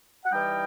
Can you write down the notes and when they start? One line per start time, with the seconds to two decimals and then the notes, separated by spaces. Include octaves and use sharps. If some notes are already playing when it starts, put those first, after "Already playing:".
0.25 F#5
0.32 E3 G3 D#4 G5